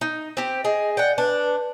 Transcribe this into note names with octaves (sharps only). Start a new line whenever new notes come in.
D#4
C4 G4
G#4 D#5
D5 F#5 G5
D4 B4